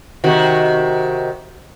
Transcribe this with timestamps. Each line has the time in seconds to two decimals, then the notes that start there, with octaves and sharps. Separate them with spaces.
0.24 C3 D#3 F#4